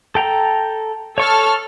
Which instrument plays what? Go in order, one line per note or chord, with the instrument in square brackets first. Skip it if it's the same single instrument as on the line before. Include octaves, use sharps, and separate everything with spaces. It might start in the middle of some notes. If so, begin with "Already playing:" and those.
[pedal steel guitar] A4 G5 A#5
[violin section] A4 F6 [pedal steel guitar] C#5 C#6